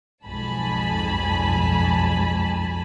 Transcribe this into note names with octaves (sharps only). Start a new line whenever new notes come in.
B1 F2 G#2 G#5 A5 B5